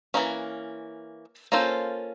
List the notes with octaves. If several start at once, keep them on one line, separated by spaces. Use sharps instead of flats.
E3 G3 A#3 C#4
A#3 C#4 F4 A4 C5